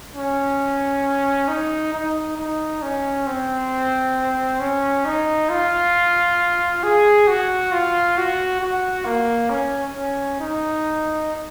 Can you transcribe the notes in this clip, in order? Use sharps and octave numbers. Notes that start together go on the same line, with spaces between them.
C#4
D#4
D#4
D#4
C#4
C4
C#4
D#4
F4
G#4
F#4
F4
F#4
F#4
A#3
C#4
C#4
D#4